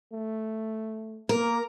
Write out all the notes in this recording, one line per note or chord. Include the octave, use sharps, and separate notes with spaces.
A3
A#3 A#4